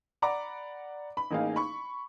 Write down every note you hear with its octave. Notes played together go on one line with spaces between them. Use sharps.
D5 F#5 A#5 B5 D6
B5
A1 A#3 D#4 G#4 F5
B5 C#6